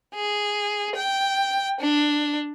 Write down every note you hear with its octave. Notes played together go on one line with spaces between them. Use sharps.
G#4
G5
D4